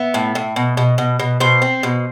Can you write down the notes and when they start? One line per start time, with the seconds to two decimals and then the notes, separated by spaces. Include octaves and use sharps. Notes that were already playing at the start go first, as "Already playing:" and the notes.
Already playing: B3 E5
0.14 A2
0.35 A2
0.56 B2
0.77 B2
0.98 B2
1.20 B2
1.40 B2 C5
1.62 C4
1.83 B2